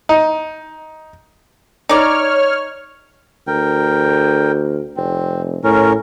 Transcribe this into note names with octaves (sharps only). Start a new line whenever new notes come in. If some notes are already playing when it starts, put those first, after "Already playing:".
D#4
D#4 C#5 D5 F6
D2 A#4 G5
F1 C4
A2 C#4 A#4